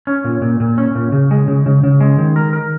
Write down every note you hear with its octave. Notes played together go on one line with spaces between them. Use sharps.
C#4
A#2
A#2
A#2
C#4
A#2
C#3
G#3
C#3
C#3
C#3
G#3
D#3
A#4
A#4